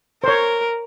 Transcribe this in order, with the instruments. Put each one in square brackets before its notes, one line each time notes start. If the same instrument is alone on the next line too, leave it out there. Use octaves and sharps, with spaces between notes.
[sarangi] A#4 [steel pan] C5 C#5